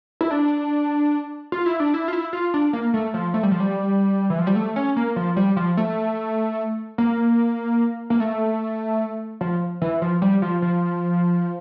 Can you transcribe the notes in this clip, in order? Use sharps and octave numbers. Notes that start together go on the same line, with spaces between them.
E4
D4
F4
E4
D4
E4
F4
E4
F4
D4
A#3
A3
F3
A3
G3
F3
G3
E3
F3
G3
A3
C#4
A#3
F3
G3
F3
A3
A#3
A#3
A3
F3
E3
F3
G3
F3
F3